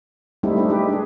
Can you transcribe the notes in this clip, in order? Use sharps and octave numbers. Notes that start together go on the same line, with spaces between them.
G3 A3 C4 D#4 E4
A3 C4 D4 D#4
G#3 G4 B4
D4 G#4